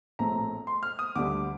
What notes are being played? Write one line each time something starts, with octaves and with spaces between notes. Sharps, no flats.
A#1 A2 A3 C4 A#5
C6
F6
D#6
D2 D3 G3 D6